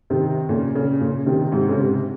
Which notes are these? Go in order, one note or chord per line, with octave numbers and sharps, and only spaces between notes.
C3 D#3
A#2 C#3
A#2 C#3
A#2 C#3
C3 D#3
G#2 C3
C#3
G#2 C3